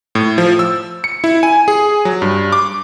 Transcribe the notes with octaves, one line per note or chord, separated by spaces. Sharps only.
A2
F3
E6
C#7
E4
G#5
G#4
F#3
G2
D6